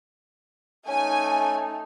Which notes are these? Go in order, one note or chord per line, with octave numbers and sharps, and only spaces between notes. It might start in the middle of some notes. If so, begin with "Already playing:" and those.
A3 C#4 D#4 G#5